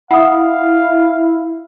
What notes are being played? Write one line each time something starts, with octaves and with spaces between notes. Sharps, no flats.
E4 F5 F#5 D#6